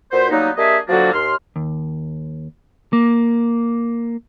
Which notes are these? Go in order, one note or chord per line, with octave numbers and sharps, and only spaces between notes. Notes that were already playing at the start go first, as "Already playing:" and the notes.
A#2 F#4 B4 C5
F#3 G3 A#3 B3 D#4
A#3 D4 G4 G#4 D#5 E5
D3 F3 F#3 A#3 D4 F#4
D#2 C6 F6
D#2
A#3